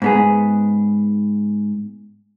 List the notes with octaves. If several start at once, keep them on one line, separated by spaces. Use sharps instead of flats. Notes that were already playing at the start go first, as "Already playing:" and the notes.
G#2 B3 G#4